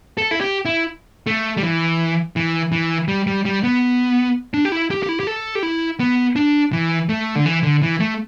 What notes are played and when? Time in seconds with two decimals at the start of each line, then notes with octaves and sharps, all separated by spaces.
0.18 A4
0.31 E4
0.41 G4
0.65 E4
1.27 A3
1.57 G3
1.63 E3
2.36 E3
2.72 E3
3.08 G3
3.27 G3
3.45 G3
3.64 B3
4.54 D4
4.65 G4
4.72 E4
4.91 G4
5.03 G4
5.09 E4
5.20 G4
5.27 A4
5.55 G4
5.63 E4
6.00 B3
6.36 D4
6.72 E3
7.09 A3
7.36 D3
7.46 E3
7.63 D3
7.82 E3
8.00 A3